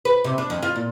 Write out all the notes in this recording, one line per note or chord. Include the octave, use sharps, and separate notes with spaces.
B4
C3
D4
F2
F4
A#2